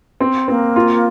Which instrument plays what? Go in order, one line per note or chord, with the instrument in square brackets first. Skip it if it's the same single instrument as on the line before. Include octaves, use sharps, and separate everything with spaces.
[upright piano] C4
[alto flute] A#3 [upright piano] C4
[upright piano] F4